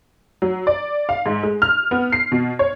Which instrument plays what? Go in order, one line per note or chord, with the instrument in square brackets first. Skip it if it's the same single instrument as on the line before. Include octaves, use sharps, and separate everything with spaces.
[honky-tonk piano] F#3
D5
F5
G#2
G#3
F6
B3
C7
B2
C#5